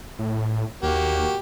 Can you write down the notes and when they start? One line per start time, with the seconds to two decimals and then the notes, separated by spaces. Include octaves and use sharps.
0.19 A2
0.83 D#2 A#3 F#4 G4